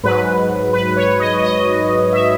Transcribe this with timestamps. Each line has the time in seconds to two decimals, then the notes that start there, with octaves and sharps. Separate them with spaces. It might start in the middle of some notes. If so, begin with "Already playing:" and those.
0.03 G#2 F#3 B4
0.73 B4
0.96 C#5
1.20 D#5
1.43 D#5
2.13 E5